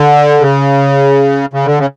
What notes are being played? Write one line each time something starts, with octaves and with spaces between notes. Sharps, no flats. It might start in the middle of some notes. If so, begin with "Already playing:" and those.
Already playing: D3
C#3
C#3
D3
C#3